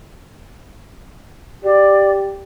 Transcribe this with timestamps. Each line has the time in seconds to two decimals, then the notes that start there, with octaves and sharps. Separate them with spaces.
1.64 G4 D5